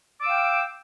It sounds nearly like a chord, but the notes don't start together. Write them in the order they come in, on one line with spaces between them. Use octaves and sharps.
D6 E6 F5 G5